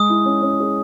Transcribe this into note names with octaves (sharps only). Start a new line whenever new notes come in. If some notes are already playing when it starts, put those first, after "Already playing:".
Already playing: G#3 D#6
E4
C#4
C#4
G#4